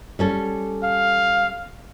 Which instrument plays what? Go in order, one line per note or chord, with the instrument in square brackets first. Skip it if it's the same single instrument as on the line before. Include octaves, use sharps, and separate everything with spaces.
[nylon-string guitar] G3 C#4 A4
[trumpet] F5